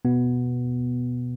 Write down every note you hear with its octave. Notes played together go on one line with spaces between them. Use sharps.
B2 B3